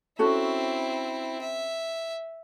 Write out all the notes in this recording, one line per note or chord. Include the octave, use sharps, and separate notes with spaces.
C4 C#4 E4 F#4 A4
E5